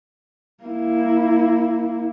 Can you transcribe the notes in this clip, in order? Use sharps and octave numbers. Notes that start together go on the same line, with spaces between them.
A#3 E4